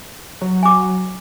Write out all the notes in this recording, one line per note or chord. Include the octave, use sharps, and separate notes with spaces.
F#3
G#5 D6